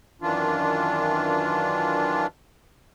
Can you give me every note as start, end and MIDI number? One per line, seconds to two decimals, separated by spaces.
0.22 2.27 42
0.22 2.27 51
0.22 2.27 52
0.22 2.27 62
0.22 2.27 65